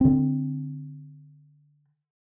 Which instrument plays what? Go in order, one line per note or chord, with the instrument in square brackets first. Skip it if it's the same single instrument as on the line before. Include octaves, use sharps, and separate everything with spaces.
[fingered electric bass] D3 C4